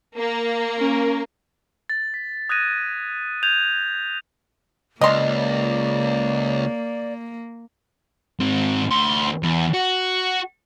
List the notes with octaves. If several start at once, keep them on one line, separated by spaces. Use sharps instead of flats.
A#3
C#4 A#4
A6
B6
D#6 F#6 G#6 A#6 D#7
G6 G#6 D#7 F7
C#2 A#3 D5 D#5 C6
G#2 C4
D2 C6
E2
F#4